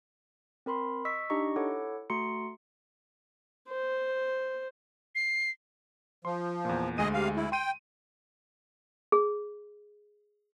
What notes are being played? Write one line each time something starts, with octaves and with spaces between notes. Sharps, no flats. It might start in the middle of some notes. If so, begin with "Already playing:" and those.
C4 A#4 B5 C6
D#5 C#6 E6 B6
D4 D#4 G4 D#5 A#5 C#6
E4 A4 C#5 F#5 D6
A3 F#4 A#5 C6 C#7
C5
C7
F3 C6
E2 A#2
D2 G#3 G#4 D#5 D#7
C3 F5
E4
G5 C6 D#7
G#4